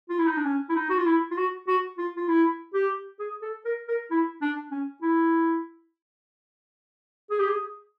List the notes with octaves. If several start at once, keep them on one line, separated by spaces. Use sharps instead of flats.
F4
E4
D#4
D4
C#4
E4
D#4
F#4
F4
E4
F4
F#4
F#4
F4
F4
E4
G4
G#4
A4
A#4
A#4
E4
D4
C#4
E4
G#4
G4
G#4